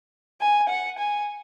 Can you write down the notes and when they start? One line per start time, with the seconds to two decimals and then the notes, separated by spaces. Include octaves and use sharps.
0.41 G#5
0.69 F#5
0.99 G#5